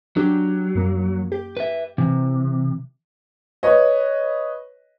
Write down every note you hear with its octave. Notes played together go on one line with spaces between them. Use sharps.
F#3 D4 G4
F#2 A#3
G4
B4 E5
C3 E3
B4 C#5 D#5